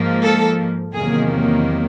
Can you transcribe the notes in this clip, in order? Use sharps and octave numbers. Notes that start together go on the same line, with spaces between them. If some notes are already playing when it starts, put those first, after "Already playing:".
Already playing: G#2 F3 A#3
A4
E2 C3 D#3 F#3 A#3 G#4